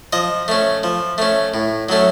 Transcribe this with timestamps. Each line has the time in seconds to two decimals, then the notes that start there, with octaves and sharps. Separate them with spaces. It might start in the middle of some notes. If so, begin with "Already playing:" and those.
0.13 F3 D#5
0.48 A3 C#4
0.83 F3
1.18 A3 C#4
1.54 A2
1.89 F#3 A3 C#4